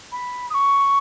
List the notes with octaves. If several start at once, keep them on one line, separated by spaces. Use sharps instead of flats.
B5
D#6
C#6